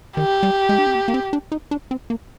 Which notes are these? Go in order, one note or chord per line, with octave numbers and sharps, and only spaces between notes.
D#3 G4
G3
G#3
D4
C4
A#3
A#3
C4
D4
D#4
D4
C4
A#3